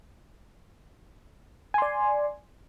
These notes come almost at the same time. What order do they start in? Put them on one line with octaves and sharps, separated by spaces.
G#5 C6 D5